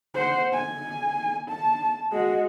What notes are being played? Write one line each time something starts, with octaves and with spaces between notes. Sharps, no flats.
C5 F#5
G#5
A5
G#3 F#4